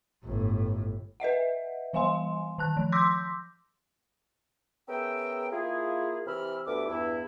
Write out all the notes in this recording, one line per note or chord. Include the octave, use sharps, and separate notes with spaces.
G1 A2
B4 D#5 E5 F#5
E3 G3 F5 G#5 C6
D#3 A5 F#6
F3
C6 D6 E6 G6 A#6 B6
B3 C#4 G#4 A#4 E5 G5
A#3 E4 F4 G#4
C3 E3 B5 E6 F6
D2 G3 B3 E5 D6
E2 G2 E4